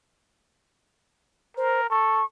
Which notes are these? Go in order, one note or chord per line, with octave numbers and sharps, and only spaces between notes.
A#4 C5
A4 C#6